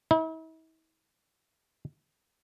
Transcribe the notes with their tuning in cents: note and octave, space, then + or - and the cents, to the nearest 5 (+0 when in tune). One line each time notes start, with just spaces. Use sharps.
E4 -45